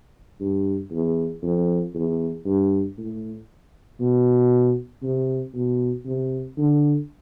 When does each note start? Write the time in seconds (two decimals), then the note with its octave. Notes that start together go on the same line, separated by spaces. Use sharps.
0.40 G2
0.91 E2
1.43 F2
1.95 E2
2.46 G2
2.98 A2
4.00 B2
5.03 C3
5.54 B2
6.06 C3
6.58 D3